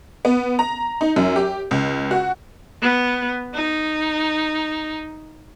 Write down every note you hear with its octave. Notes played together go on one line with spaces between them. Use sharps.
B3
A#5
D#4
F#2
G4
C#2
F#4
B3
D#4